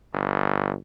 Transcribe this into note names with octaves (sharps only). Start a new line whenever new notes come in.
G1